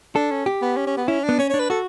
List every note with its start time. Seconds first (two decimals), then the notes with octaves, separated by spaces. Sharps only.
0.15 D4 A4
0.31 C#4
0.46 G4
0.62 B3
0.77 C#4
0.87 C#4
0.97 B3
1.08 C#4 E4
1.24 D4
1.29 B3
1.39 C#4 C#5
1.50 D4 C#5
1.59 B4
1.70 F#4 A4